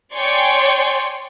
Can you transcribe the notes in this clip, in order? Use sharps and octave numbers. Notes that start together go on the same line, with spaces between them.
C#5 D5 G5 G#5 C6 C#6